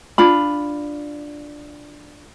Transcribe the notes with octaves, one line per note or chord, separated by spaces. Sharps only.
D4 F4 B5